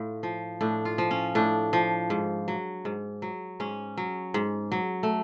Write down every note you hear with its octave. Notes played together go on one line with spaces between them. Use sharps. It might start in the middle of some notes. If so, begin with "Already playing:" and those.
Already playing: A2 F4
F3
A2 D4
F4
F3
C#4
A2 D4
F3
G#2
F#3
G#2
F#3
G#2 C#4
F#3
G#2
F#3
A3